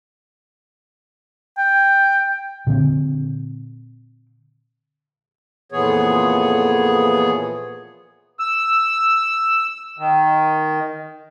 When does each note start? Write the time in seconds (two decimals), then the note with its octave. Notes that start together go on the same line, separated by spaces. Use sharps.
1.58 G5
2.67 A#2 D3 C4
5.72 F2 A#2 E3 B3 G#4 C#5
8.39 E6
9.98 D#3